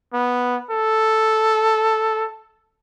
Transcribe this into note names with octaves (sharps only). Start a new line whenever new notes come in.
B3
A4